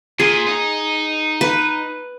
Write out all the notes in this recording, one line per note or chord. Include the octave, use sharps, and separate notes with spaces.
A#2 G#4
D#4
B4